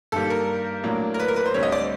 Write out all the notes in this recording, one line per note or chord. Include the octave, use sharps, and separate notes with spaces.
G2 D#3 G3 A#3 A4
A#4
A2 F#3 A#3 D4
A#4
B4
A#4
B4
C5
D2 D3 G3 C4 C#5
D#5
D5